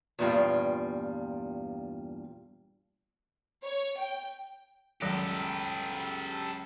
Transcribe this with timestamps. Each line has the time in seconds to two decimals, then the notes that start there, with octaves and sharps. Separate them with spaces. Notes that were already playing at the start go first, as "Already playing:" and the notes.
0.19 E2 G2 A#2 F3 G3 F4
3.64 C#5
3.98 G5
5.02 C#2 F#2 D#3 F#3 G3 G4 A4